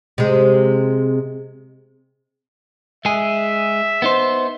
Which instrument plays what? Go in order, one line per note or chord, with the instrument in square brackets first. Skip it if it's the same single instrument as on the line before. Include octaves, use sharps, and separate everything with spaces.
[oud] C3 G#3
[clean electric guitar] G#3 G#4 [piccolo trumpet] E5
[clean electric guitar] B3 D#4 C5